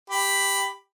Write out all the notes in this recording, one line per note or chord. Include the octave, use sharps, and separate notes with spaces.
G4 B5